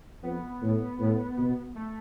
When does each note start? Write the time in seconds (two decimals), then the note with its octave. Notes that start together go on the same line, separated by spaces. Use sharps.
0.22 F2 B3
0.62 A2
1.00 A2
1.37 B2
1.76 A3